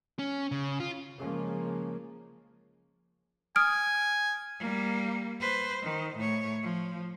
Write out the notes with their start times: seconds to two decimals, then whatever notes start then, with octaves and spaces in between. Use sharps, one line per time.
0.19 C#4
0.52 C#3
0.80 F4
1.19 C#3 F3 G#3 A#3 C#4
3.56 G#5 D#6 F6 D7
4.59 G3 A#3
5.40 B4 C5
5.83 D#3
6.16 A2 C#5
6.62 F3